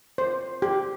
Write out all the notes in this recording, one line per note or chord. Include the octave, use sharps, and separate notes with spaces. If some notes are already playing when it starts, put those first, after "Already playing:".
C5
G4